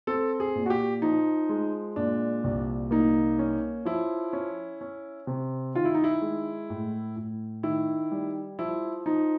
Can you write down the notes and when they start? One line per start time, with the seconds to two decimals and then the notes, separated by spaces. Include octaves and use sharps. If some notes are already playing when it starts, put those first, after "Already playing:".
0.07 C4 A4
0.40 G#4
0.55 A#2
0.66 F#4
0.70 G4
1.02 F3 D#4
1.49 G#3
1.96 A#2 D4
2.44 C2
2.91 A#3 D#4
3.39 C#4
3.85 F3 E4
4.33 C#4
4.81 C#4
5.27 C3
5.75 D#3 F4
5.85 E4
5.94 D#4
6.04 E4
6.22 G#3
6.70 A2
7.16 A2
7.63 D#3 E4
8.11 G3
8.59 F3 E4
9.06 F3 D#4